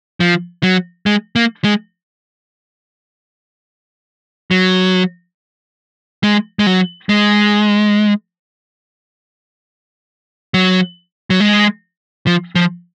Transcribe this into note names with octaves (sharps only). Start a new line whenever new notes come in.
F3
F#3
G#3
A#3
G#3
F#3
G#3
G#3
F#3
G#3
F#3
F#3
G#3
F3
F3